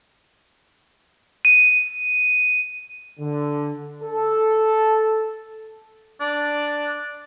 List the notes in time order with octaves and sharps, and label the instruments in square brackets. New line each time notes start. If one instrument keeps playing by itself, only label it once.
[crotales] D#7
[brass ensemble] D3
A4
[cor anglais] D4